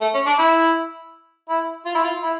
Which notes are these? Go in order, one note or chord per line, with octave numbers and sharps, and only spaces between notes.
A3
C#4
D4
E4
E4
F4
E4
F4
E4